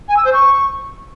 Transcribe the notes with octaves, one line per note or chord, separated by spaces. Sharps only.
G#5
E6
C5
C#6